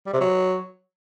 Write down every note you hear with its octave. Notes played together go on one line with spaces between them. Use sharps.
G3
C3
F#3